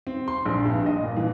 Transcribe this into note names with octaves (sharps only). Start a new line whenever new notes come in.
C4
C6
A#1
G2
D#5
A#2
E3